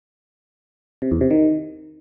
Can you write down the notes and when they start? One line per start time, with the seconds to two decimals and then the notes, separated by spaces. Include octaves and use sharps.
1.02 C3
1.11 E2
1.21 C3
1.30 D#3